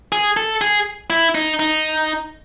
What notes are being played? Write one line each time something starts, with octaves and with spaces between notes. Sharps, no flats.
G#4
A4
G#4
E4
D#4
D#4